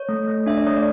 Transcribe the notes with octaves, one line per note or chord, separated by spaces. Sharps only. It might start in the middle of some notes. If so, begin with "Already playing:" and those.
Already playing: C#5
A3
A3
D4 E5
D5
A3 C#5
D5